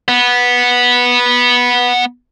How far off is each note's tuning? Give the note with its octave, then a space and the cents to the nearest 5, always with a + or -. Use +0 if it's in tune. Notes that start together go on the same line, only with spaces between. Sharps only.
B3 -10